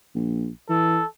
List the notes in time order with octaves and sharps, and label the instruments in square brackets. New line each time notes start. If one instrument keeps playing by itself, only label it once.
[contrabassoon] A#1
[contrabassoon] E3 [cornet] A4